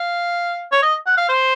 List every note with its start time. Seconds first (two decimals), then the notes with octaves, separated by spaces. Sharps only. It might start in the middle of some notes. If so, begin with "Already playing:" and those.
Already playing: F5
0.71 C#5
0.82 D#5
1.06 F#5
1.17 F5
1.29 C5